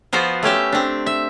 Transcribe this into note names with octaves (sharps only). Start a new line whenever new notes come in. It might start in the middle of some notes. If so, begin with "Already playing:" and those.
F3 B3 F4 F#4 C5
A3 C#4 G4 E5
C4 D4
E5